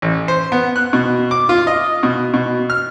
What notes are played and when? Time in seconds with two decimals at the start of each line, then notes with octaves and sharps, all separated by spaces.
0.02 A1
0.28 C5
0.52 B3
0.76 F#6
0.93 B2
1.31 D6
1.49 F4
1.67 D#5
2.03 B2
2.34 B2
2.70 F6